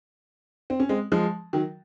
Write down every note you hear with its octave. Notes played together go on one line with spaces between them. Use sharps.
C4
C#4
G#3 C4
F3 G#3
D#3 F#3